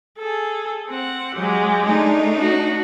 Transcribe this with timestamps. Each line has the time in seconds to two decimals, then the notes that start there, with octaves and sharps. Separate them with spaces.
0.18 G#4 A4
0.88 C4 F#5
1.35 F#3 G#3 G4
1.84 A3 D4 D#4
2.38 F#4